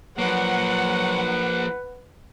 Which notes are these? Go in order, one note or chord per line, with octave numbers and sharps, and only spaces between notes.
F3 F#3 A#3 B4 F#5